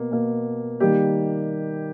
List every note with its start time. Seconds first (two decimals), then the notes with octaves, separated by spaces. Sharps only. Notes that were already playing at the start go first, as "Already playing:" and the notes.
Already playing: B2 A#3
0.12 B2 A#3
0.80 D#3 G3 A#3 G4